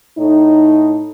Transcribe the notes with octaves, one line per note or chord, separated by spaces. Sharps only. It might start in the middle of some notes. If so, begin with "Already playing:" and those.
A2 D#4